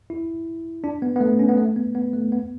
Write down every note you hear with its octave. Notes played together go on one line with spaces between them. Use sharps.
E4
D4
B3
B3
A3
C#4
B3
A3
B3
B3
A3
B3